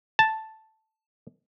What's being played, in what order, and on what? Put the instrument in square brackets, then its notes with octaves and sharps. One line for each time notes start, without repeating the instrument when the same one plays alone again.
[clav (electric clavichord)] A5